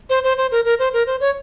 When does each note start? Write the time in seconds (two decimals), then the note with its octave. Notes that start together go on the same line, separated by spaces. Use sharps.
0.10 C5
0.24 C5
0.37 C5
0.51 A#4
0.65 A#4
0.79 C5
0.93 A#4
1.07 C5
1.21 C#5